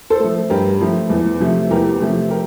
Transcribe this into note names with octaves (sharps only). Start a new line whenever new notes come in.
A4 C5
F3 A3
G2 G4 A#4
F3 A3
E2
C3 F3 A3
E2 G4 A#4
C3 F3 A3
G4 A#4